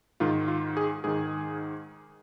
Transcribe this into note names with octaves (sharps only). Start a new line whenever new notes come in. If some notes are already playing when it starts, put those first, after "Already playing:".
G#2 D#3 F4
F4
G#4
G#2 D#3 G#4